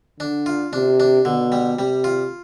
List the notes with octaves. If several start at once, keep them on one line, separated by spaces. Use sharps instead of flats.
D3 D4
F4
C3 D4
D4
B2 D3
G3
C3 G3
F4